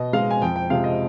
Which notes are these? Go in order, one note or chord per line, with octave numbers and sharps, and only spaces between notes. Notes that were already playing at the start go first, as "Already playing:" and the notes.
Already playing: B2 D#5
G#3 F5
G#5
F2 G5
G5
C3 F3 G#3 F5
D#5